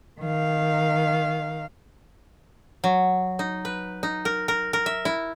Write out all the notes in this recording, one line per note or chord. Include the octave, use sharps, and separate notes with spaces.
D#3 F5
F#3
D#4
B4
D#4
A#4
A#4
A#4
E5
E4